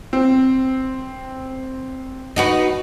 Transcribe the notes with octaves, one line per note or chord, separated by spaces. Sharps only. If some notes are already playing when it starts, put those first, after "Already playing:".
C4
D#4 F#4 B4